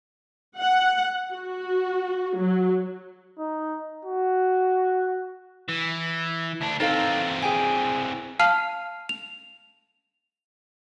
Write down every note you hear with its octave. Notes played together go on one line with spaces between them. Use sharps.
F#5
F#4
F#3
D#4
F#4
E3
D2 D4
E3 C4 D#4 A4 F5
G#4 G5 G#5
F5 A5 F6 C7 F7
F7